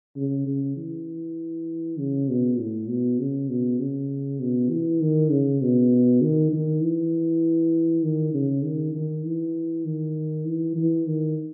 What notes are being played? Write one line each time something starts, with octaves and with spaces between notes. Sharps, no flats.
C#3
C#3
E3
C#3
B2
A2
B2
C#3
B2
C#3
B2
E3
D#3
C#3
B2
D#3
D#3
E3
D#3
C#3
D#3
D#3
E3
D#3
E3
E3
D#3